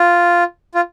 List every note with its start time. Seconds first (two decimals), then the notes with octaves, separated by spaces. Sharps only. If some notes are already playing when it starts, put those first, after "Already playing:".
Already playing: F4
0.75 F4